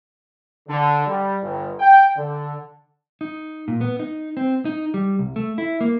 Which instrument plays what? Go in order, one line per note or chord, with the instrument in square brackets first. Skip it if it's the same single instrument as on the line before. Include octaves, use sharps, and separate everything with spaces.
[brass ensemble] D3
G3
G1
G5
D3
[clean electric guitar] D#4
A#2
B3
D#4
C4
D#4
G3
C2
A3
E4
A#3